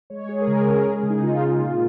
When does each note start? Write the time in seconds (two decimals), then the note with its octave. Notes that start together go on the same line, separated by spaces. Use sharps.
0.10 G#3 C#5
0.29 G#3 G#4
0.41 A#4
0.47 C#3 G#4
0.66 C#3 A#4
0.85 G#3 G#4
0.98 G#4
1.03 C#3
1.10 D#4
1.22 C#3 F4
1.41 G#3
1.59 A#2